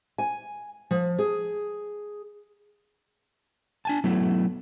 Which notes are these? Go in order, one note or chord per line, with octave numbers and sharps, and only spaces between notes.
G#5
F3
G#4
D4 G#5 A5
F#3 A3 B3 E4